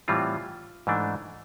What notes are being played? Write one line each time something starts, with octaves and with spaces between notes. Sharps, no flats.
A2 E3 G3 C4 F4
G#2 E3 A3 D4